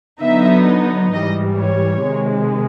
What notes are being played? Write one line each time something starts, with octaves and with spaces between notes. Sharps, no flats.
D3 F#3 B3 D#4 E5
G#2 E3 G3 D#5
C#5
C3 D#3 G#3